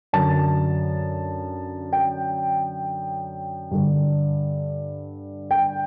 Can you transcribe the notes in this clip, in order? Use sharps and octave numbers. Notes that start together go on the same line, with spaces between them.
F#2 D3 A5
G5
G2 D3
G5